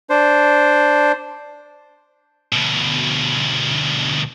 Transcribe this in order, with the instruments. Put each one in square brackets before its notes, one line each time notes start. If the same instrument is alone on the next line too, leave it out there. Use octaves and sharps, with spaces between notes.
[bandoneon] D4 C5
[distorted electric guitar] D2 B2